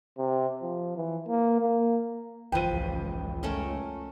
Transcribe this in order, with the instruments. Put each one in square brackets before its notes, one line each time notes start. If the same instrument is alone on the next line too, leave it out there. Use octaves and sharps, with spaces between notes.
[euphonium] C3
F3
E3
A#3
A#3
[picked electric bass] A1 F#2 E3 [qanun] F3 B4 [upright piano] G5 D#7
[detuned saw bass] C#2
[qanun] A3 C#4 A#4